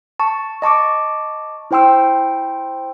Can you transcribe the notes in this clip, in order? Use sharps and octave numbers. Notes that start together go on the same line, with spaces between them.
A5 C#6
D#5 A5 C#6 D6
E4 C5 G5 C6 E6